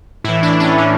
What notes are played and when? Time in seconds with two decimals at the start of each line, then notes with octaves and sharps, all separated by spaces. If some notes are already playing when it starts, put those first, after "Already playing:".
0.24 A2 E3 E4
0.43 D4
0.60 C#4
0.78 A2 E3